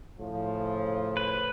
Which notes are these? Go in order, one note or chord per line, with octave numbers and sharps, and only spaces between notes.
A2 C#3 F3
B4